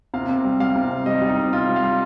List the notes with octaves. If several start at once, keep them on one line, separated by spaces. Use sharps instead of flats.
C3 F5
C3
G3
G3 F5
C3
C3
G3 D#5
G3
D#4
C3
C3 F4
G3
F5
G3